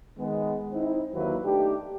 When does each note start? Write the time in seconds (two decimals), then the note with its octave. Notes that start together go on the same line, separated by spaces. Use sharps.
0.18 D#3 G#3 B3
0.72 C4 D#4 E4
1.13 D#2 D3 F#3 A#3 E4 B4
1.44 A3 D4 D#4 G4